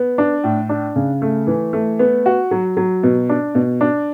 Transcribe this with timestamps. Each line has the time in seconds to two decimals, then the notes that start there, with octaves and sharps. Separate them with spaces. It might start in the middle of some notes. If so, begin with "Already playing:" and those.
Already playing: B3
0.18 D4
0.44 A2
0.69 D4
0.96 C#3
1.22 A3
1.47 E3
1.73 A3
1.99 B3
2.26 F#4
2.51 F#3
2.77 F#3
3.03 B2
3.29 D4
3.55 B2
3.81 D4